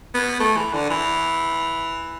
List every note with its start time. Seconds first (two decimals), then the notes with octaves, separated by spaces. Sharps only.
0.15 B3
0.40 A3
0.57 E3
0.73 D3
0.90 E3